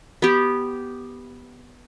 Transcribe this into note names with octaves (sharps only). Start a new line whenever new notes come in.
B3 G4